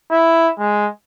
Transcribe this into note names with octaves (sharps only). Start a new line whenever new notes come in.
E4
G#3